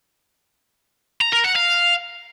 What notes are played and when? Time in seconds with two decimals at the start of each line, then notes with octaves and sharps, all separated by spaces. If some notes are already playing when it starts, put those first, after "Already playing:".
1.21 A#5
1.33 A#4
1.44 F#5
1.56 F5